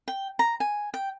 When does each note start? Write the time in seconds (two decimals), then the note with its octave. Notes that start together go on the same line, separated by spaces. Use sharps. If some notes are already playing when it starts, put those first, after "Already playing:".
0.08 G5
0.39 A#5
0.60 G#5
0.94 G5